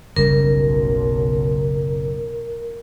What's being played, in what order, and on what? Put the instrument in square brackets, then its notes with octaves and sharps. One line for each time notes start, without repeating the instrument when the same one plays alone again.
[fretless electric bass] F#1 C#3 G3 [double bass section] B1 [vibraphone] A#4